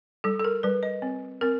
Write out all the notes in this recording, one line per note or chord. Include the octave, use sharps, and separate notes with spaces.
G3 A4
A4
A#4
G3 B4
D#5
C4
C4 A#4